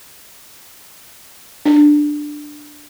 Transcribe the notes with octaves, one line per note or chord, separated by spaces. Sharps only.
D4